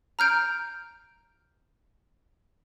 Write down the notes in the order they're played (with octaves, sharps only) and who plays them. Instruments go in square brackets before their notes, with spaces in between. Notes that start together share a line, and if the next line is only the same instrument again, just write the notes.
[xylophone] A#5 F6 G6 D7